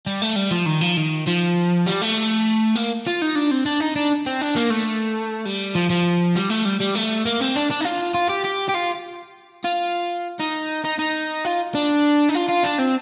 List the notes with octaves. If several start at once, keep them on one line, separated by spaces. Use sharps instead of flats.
G3
A3
G3
F3
D#3
F3
D#3
F3
G3
A3
A#3
F4
D#4
D4
C4
D4
D#4
D4
C4
D4
A#3
A3
G3
F3
F3
G3
A3
G3
G3
A3
A#3
C4
D4
D4
D#4
F4
F4
G4
G4
G4
F4
F4
D#4
D#4
D#4
F4
D4
D#4
F4
F4
D4
C4